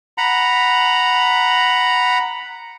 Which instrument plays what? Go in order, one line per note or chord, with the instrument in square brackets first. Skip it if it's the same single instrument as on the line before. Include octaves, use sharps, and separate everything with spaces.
[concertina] F#5 A#5 B5